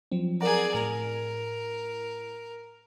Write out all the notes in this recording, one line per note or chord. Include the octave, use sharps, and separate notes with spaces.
F3 F#3 C4
G#4 A#4 D5 F#5 A#5
A2 A#4